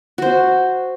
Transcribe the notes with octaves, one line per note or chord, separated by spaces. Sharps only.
F#4 C5